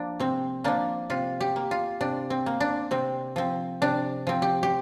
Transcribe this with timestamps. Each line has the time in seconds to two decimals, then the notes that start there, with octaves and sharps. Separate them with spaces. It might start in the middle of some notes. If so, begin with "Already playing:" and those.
Already playing: F3 A#3 D4
0.20 C3 C4
0.64 F3 A#3 D4
1.10 C3 F4
1.41 G4
1.56 A#3
1.71 F4
2.01 C3 D4
2.30 C4
2.46 A#3
2.60 D4
2.91 C3 C4
3.36 F3 C4
3.82 C3 D4
4.27 F3 C4
4.42 G4
4.63 G4